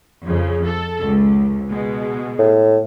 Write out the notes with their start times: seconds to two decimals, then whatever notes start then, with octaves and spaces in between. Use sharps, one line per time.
0.25 F2 C#3
0.65 A4
1.03 C#2
1.69 B2 G#3
2.39 A2